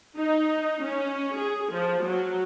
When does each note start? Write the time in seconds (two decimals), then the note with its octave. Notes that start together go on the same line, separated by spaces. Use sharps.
0.17 D#4
0.83 C#4
1.36 G#4
1.72 F3
2.03 F#3